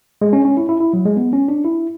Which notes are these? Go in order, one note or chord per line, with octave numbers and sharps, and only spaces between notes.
G#3
C#4
C#4
E4
E4
E4
F#3
G#3
B3
C#4
D4
E4